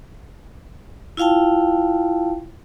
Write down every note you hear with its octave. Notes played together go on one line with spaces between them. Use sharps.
E4 F4 F5 G5 A5